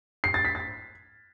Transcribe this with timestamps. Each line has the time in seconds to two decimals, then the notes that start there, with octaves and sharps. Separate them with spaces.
0.24 C7
0.34 A6
0.45 B6
0.55 A6